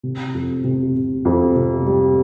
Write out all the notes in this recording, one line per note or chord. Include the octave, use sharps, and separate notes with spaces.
C3
F2
C3
C3
F2
C3
G3